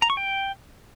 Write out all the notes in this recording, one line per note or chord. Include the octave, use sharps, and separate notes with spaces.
A#5
C#6
G5